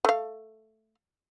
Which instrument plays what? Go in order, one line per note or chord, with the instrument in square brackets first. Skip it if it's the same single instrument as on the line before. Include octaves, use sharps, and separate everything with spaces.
[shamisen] A3 F5